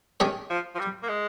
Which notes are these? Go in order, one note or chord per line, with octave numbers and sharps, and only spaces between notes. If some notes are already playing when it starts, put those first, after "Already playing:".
D#3 G#3 C#4 G4 C#5
F3
F3
G3
A#3
G#3